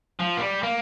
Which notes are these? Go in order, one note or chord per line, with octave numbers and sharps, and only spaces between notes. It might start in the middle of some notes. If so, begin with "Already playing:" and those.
F3
A#3
G3
A#3